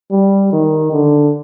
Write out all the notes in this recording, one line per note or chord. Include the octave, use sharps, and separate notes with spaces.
G3
D#3
D3